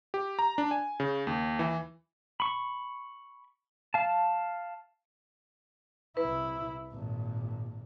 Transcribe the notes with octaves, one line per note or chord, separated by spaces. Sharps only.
G4
A#5
D4
G#5
C#3
D#2
E3
B5 C#6
F5 A5
C2 E4 B4
G#1 A#2